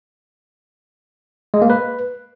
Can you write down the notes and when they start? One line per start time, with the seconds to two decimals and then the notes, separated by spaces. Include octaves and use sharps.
1.54 G#3
1.62 A#3
1.70 B4